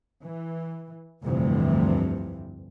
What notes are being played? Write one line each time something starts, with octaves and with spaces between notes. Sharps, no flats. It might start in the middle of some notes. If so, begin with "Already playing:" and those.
E3
F1 D2 G2 C3 E3 F3